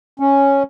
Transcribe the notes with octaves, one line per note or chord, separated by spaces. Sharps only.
C#4